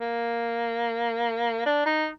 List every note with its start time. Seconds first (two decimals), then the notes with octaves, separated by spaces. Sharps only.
0.01 A#3
1.66 D4
1.86 D#4